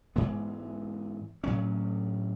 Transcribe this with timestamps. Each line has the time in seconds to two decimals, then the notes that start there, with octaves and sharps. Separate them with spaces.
0.16 G#2 E3 G#3 B3
1.44 A2 F#3 C#4